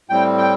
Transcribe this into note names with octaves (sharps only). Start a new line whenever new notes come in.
A2 G3 C4 G5
G5